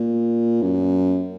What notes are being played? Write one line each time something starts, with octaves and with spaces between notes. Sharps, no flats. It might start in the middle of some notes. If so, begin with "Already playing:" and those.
Already playing: A#2
F#2